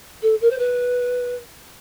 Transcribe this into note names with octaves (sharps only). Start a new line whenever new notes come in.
A4
A#4
C5
B4